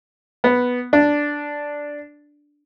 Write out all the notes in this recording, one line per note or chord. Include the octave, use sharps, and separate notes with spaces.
B3
D4